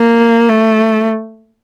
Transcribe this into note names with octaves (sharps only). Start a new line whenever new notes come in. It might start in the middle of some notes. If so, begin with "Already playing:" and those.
Already playing: A#3
A3